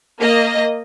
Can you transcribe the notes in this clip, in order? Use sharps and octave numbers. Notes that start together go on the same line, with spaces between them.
A#3 D#5